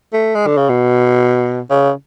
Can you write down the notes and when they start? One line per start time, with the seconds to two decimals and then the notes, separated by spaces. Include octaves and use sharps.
0.13 A3
0.35 G#3
0.47 D3
0.57 C#3
0.69 B2
1.70 C#3